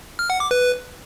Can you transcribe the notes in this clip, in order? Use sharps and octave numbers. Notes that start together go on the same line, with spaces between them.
F6
F#5
D6
B4